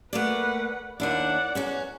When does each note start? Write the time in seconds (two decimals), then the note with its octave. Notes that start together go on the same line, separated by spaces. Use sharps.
0.13 A3 A#3 B4 D5 F#5
1.00 D#2 D4 E4 D5 F#5
1.55 E2 C#4 F#4